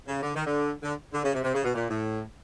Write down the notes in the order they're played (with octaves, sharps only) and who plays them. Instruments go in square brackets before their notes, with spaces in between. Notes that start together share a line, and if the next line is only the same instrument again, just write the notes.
[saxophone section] C#3
D3
D#3
D3
D3
D3
C#3
C3
C3
C#3
B2
A#2
A2